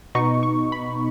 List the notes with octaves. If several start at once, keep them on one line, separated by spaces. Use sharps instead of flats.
B2 B3 D#4 C#6
C#6
B5